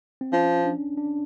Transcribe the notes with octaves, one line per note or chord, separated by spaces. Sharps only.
C4
F3 C#4
D4
D4